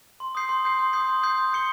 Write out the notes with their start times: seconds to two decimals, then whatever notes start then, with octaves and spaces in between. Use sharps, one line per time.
0.20 C6
0.35 D#6 G6 C7
0.49 C6
0.64 D#6 G6 C7
0.79 C6
0.93 D#6 G6 C7
1.09 C6
1.23 D#6 G6 C7
1.38 C6
1.52 D#6 G6 C#7 G7